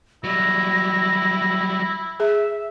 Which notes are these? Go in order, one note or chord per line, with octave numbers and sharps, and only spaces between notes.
F#3 G3 E4 A#6
G#4 E5